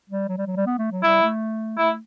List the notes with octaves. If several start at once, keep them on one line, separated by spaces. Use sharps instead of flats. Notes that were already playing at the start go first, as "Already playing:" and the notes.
G3
F#3
G3
F#3
G3
B3
A3
F#3
G3 E4
A3
A3 E4